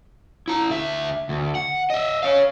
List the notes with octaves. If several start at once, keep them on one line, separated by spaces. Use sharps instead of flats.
E4 A#5
D2 E5
D2
F#5
D#5 E5
C#5 F5